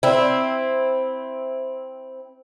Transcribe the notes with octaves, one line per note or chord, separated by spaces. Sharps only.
C4 E4